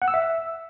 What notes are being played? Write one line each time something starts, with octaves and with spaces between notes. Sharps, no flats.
F#5
E6
E5